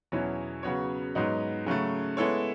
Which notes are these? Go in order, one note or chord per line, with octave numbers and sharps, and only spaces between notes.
E2 B2 F#3 C#4 E4
C#3 F#3 B3 F#4 C#5
G#2 F#3 B3 D#4
C#3 F#3 A3
G#3 B3 E4 A4 C#5